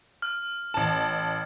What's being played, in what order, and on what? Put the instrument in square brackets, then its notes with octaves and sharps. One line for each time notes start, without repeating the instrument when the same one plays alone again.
[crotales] F6
[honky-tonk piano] A1 A5